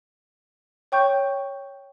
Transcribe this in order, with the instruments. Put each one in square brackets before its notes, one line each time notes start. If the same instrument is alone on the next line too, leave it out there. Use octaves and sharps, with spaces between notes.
[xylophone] C#5 G5 C#6 G6